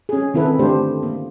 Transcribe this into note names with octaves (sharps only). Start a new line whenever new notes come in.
C#4 G#4
D#3 C4 E4 A4 B4
D3 A3 D4 G4 C5
A#3